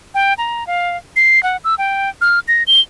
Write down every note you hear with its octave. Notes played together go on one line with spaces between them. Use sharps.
G5
A#5
F5
C7
F#5
E6
G5
F6
A#6
G7